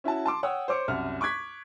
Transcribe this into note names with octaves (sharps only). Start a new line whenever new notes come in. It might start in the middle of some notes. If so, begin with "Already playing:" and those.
C#4 E4 F#4 A5
A5 C6 D6
C#5 F#5 G5 D#6 E6
C5 C#5 D6 C#7
C2 F#2 F#5 F6
C#6 D6 F#6 G#6 B6